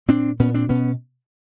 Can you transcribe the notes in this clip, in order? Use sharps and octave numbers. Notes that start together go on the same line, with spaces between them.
A#2 C4 D4
A#2 B3 C#4
C4 D4
B2 B3 C#4